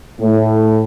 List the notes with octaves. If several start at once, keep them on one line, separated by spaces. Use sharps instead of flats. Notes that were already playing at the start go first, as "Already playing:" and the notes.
A2